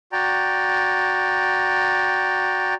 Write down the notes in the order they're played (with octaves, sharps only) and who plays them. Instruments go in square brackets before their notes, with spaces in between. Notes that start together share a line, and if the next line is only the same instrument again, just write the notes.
[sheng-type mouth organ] F#4 D5 G5 A#5